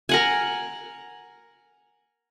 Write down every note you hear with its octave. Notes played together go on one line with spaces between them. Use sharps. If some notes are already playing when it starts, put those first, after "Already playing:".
A#4 F#5 G#5